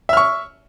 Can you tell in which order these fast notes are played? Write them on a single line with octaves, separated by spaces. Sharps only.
E5 F6 C#6